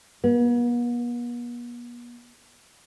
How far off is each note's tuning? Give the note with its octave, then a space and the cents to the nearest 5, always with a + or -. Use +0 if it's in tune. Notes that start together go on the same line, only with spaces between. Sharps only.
B3 -45